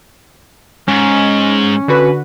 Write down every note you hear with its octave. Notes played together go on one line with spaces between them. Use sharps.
G#2 C#4
D3 F#4 B4